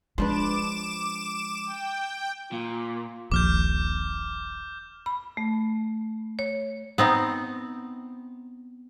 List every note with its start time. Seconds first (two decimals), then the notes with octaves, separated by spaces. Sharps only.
0.18 F3 G#3 D4 B4 D6 E7
1.66 G5
2.52 A#2 F4
3.32 D#1 A#1 D6 F6 G6
5.06 B5
5.37 A3
6.39 C#5
6.98 B3 C4 D#4